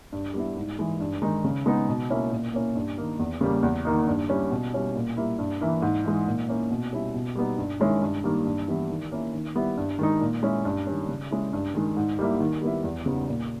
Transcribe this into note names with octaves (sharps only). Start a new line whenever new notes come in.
G2
G3 B3 E4
G#2
E3 G#3
G2
D#3 G#3 D#4
C#3
G#3 B3 D#4
B2
A#3 C#4 E4
A#2
A#3 C#4 E4
G2
D#3 A#3 D#4
E2
C#3 G3 A#3
E2
D#3 A#3 D#4
G2
G3 C#4 E4
B2
G3 C#4 E4
A#2
G3 A#3 E4
G2
E3 A#3 E4
G#2
E3 G#3
A#2
A#3 C#4 E4
B2
G3 C#4 E4
B2
G3 B3 D#4
G2
D#3 G#3 C#4 E4
G2
D#3 G3 A#3
G2
E3 G3 B3 E4
D#3
A#3 C#4 E4
D#3
G3 B3 E4
G2
D#3 G#3 D#4
A#2
G#3 C#4 E4
G2
D#3 G3 C#4
C#3
G#3 C#4 E4
G2
D#3 G#3
G#2
G3 A#3 E4
D#3
G3 B3 E4
E2
C#3 G3 B3 D#4
A#2